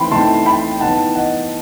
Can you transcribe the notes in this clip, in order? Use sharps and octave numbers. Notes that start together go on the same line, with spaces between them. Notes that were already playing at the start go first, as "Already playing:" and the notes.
Already playing: E3 A3 C4 D#4 G5 B5 C6
E3 A3 C4 D#4 A5 C6
G5 B5
E3 B3 D#4 F#5 A5
D#5 F#5